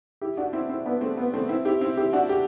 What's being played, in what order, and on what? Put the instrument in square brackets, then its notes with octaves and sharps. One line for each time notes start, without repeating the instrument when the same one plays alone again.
[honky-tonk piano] E4 G4
D4 F#4
C4 E4
C4 E4
B3 D4
A3 C4
B3
A3 C4
C4 E4
E4 G4
C4 E4
E4 G4
D4 F#4
G4